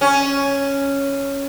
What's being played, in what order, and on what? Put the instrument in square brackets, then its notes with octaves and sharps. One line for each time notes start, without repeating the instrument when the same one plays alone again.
[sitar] C#4